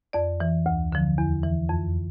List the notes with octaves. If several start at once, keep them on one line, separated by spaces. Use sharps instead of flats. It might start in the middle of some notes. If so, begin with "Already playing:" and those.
F2 D5
E3
D2
D3 F3
E2
E3
F2